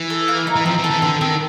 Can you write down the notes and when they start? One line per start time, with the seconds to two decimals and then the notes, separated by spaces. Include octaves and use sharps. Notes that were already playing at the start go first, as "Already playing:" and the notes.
Already playing: E3
0.10 A4
0.28 A#3
0.47 D#4
0.56 E3
0.66 F3 C4
0.78 E3
0.84 A4
0.90 E3
1.02 D3 C4
1.21 D#3 C4